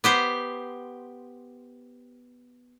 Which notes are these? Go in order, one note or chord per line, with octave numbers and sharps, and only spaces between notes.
B3 G4 C5